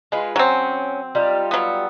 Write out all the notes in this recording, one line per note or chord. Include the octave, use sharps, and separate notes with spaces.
G#3 F4 B4
F#3 C4 C#4
G3 D#4 F4
F#3 B3